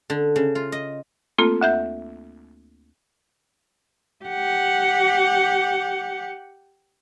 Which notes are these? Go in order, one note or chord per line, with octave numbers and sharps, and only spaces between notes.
D3
C#3
F4
D#5
A3 A#3 C4 F4 A4
D2 E5 G6
G4 F#5